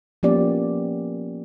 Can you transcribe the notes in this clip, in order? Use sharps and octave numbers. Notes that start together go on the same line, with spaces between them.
F3 A#3 B3 C#4 G4 D5